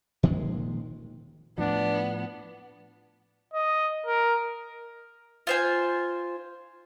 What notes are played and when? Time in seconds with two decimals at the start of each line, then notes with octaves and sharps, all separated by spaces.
0.23 A#2 D#3 F3 G#3
1.58 A2 F3 B3 D4
3.54 D#5
4.06 A#4
5.47 F4 C5 G#5